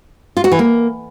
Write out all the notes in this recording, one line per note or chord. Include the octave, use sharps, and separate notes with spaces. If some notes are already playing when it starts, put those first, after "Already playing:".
F4
F#4
E3
A#3